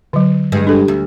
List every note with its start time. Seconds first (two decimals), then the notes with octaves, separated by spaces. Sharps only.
0.13 D3 F#3
0.52 G2 G#3
0.67 D4 A4
0.88 D2